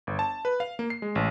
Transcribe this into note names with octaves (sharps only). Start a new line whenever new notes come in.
G1
A5
B4
F5
A#3
C7
G#3
A1